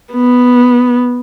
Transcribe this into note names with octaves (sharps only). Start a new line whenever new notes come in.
B3